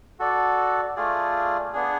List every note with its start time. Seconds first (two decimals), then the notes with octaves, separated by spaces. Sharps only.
0.19 F#4 A4 D5
0.96 A3 F4 G#4 D5
1.73 B3 D4 G#4